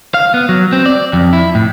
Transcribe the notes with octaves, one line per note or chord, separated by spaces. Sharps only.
F5
B3
F#3
C4
D5
F2
E4
A2